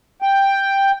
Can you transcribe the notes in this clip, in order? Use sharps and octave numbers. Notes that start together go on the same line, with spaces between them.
G5